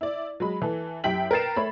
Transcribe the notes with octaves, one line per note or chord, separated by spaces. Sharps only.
E4 D5
F#3 G#3 B5
E3 A4
F#2 E4 G4 G5 B6 F#7
A#4 B4 G5 A6 C7 E7
A3 C#5 B5